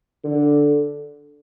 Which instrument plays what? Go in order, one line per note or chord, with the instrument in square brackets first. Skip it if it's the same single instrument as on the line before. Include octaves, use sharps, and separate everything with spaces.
[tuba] D3